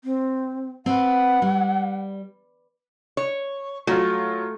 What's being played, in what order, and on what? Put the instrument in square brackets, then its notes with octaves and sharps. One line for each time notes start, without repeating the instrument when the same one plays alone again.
[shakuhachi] C4
[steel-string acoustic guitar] C4 B4 [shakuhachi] F#5
[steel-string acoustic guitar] G3
[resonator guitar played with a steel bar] C#5
[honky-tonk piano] F#3 F4 [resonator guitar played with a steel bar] A3